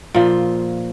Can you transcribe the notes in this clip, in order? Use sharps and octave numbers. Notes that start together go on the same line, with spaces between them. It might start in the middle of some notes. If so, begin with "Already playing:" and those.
A#2 F3